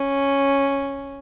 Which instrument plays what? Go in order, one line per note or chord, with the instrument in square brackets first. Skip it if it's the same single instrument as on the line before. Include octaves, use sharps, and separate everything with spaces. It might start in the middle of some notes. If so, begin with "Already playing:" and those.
Already playing: [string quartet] C#4